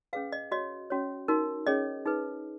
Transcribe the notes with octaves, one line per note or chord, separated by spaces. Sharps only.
C#4 G#4 B4 F5
D#5
F#4 C#5 D#5
C#4 F#4 C#5
D#4 F#4 A#4
C#4 G#4 C#5 D#5
D#4 G#4 B4